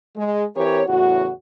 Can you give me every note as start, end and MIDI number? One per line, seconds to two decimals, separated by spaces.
0.16 0.45 56
0.56 0.82 52
0.56 0.82 60
0.56 0.82 67
0.56 0.82 70
0.56 0.82 73
0.87 1.30 40
0.87 1.30 45
0.87 1.30 49
0.87 1.30 66